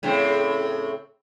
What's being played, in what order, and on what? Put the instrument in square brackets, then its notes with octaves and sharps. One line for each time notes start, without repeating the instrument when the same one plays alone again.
[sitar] A2 C#3 C4